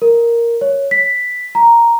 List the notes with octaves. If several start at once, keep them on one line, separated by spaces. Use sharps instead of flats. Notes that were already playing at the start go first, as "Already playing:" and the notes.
A#4
C#5
B6
A#5